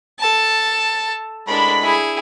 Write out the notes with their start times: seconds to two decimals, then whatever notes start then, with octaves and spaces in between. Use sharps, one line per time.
0.20 A4 A5
1.48 A2 G#3 D4 A#4 B5
1.82 E4 G#4